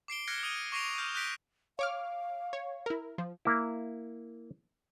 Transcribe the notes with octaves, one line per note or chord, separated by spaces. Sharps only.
D6 C7 D7 G7
F6 F#6 G#6 A#6 C#7 G7
D#6 D#7
C#6 D6 A#6 C7 D7 F7
D#6 F6 G6
D#6 F#6 G6 A#6 B6 D7
C#5 F5 D6 F6
C#5
E4 A#4
F3
A#3 E4